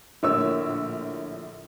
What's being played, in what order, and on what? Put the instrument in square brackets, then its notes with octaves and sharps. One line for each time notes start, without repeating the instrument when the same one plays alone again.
[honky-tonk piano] A#1 A2 D3 [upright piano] A#3 C#5 E6